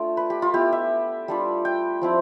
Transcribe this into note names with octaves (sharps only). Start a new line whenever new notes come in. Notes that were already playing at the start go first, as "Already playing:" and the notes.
Already playing: A3 D4 F4 G5
B4
G4
F4
B3 E4 G4
E5
G3 D4 F4
G5
F3 C4 E4